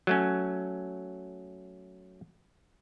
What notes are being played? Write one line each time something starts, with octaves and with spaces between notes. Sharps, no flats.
F#3 A3 C#4